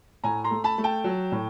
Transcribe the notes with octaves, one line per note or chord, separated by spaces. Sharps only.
A2 G#5 A#5
A#5 C6
A3
A5 B5
A3
G5 A5
F#3
A2